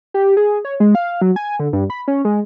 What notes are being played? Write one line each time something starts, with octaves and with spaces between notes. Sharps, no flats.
G4
G#4
C#5
G#3
F5
F#3
G#5
D3
G2
B5
C#4
G#3